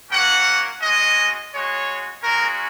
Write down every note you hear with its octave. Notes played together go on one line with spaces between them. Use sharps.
A#3 C#4 F#4 F#5
G#3 C#4 F#4 D#5
G#3 F#4 C#5
G#3 C#4 F#4 A#4